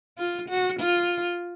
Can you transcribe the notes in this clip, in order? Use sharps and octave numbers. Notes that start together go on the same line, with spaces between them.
F4
F#4
F4